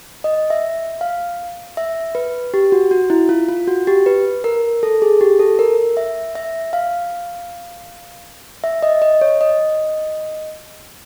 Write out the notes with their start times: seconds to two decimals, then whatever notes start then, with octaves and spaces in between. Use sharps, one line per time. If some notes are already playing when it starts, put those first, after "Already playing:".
0.24 D#5
0.50 E5
1.01 F5
1.77 E5
2.15 B4
2.54 G4
2.72 F#4
2.91 F#4
3.10 E4
3.29 F4
3.49 F4
3.67 F#4
3.87 G4
4.06 B4
4.44 A#4
4.83 A4
5.02 G#4
5.21 G4
5.39 A4
5.59 A#4
5.97 E5
6.35 E5
6.73 F5
8.64 E5
8.83 D#5
9.02 D#5
9.21 C#5
9.41 D#5